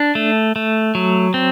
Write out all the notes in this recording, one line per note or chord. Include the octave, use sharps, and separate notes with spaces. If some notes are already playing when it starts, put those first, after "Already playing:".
Already playing: D4
A3
A3
F#3
C4